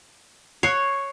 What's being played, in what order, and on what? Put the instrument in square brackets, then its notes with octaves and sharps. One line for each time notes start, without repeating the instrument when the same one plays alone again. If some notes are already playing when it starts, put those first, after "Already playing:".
[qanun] C#5 [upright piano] F#6 C7 C#7